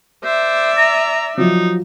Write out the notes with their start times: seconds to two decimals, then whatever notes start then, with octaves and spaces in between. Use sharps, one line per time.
0.24 C5 D5 E5
0.78 A#5
1.37 F3 F#3 D#4